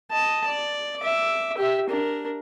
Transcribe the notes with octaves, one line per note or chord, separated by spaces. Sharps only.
D#5 A5
D5
E5 D6
G4 E5
D4 A#4